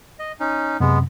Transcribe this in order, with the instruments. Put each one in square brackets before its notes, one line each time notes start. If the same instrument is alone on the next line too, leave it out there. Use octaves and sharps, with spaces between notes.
[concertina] D#5
C#4 D#4
[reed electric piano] F#2 C3 [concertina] G#3 B3